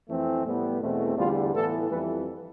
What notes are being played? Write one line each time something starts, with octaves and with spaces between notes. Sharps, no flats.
F2 E3 A3 C4
A2 G3 B3
E2 B2 A3 C4
E2 D3 G3 F4
A2 E3 B3 A4
F2 E3 G3 B4